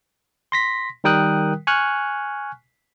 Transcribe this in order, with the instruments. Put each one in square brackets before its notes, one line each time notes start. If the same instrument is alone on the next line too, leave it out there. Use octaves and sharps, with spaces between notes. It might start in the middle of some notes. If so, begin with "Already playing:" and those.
[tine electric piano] C6 A#6 B6
D#3 G3 A#4 G5 D#6 F#6
G#5 C#6 F6 F#6